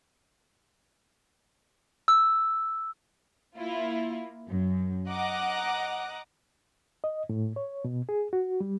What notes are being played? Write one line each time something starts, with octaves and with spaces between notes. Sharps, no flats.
E6
A#3 E4 F4
F#2
D#5 F#5 A#5 D6 F#6
D#5
A2
C#5
B2
G#4
F#4
G3